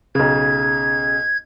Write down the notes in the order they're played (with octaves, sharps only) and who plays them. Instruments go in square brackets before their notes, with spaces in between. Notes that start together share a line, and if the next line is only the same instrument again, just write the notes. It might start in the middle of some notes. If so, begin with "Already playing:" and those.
[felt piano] B1 C#3 [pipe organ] G#6